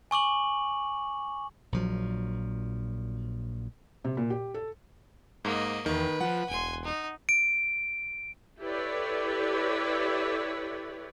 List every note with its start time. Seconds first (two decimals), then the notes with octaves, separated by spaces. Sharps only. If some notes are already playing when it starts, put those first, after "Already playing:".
0.11 G#5 C#6 D6 F#7
1.72 A#1 F3 F#3
4.04 C3
4.17 A#2
4.30 G4
4.54 A4
5.45 G#2 A#3 D#5
5.86 E2 D#3 B4
6.21 F3 F#5
6.49 E1 G#5 C6
6.84 D#4
7.29 D7
8.59 E4 G4 A4 B4 C#5 D5